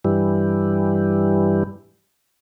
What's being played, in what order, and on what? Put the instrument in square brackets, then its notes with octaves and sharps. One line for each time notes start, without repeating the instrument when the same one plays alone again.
[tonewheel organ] G2 E3 G3